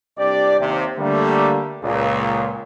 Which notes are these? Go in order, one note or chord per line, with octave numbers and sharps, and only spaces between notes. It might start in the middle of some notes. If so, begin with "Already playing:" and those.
C2 C4 D4 G4 D5
D#2 C3
D3 G3 A3 A#3
C#2 A#2